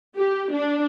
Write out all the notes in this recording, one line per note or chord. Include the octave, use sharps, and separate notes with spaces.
G4
D4